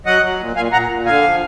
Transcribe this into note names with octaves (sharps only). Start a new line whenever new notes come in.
F#3 D#5 F#5
F#3
A#2
A#2 F5 G#5
A#2 F#5 A#5
A#2
D3 F5 G#5
F3